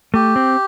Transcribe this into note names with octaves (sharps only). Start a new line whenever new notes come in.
A3 G4
C4